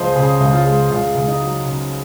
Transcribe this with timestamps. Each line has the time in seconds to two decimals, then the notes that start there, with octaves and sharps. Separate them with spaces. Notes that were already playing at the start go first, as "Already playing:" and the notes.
Already playing: C#2 F3 G#3 C5 D#5
0.15 C#3 G#4
0.40 C#2
0.53 F4
0.65 G#3
0.90 C#2 F4
1.15 C#2
1.28 D#4
1.40 F#3
1.65 C#3